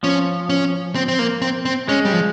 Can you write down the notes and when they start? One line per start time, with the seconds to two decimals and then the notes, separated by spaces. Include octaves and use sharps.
0.03 F3 C#4
0.49 C#4
0.95 C4
1.08 C4
1.19 A#3
1.42 C4
1.65 C4
1.88 G#3 C#4
2.05 G3
2.12 F3